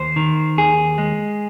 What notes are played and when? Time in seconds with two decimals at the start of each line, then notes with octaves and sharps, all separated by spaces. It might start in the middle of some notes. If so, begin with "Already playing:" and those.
Already playing: D#2 C5
0.16 D#3
0.57 D#2 G#4
0.98 G#3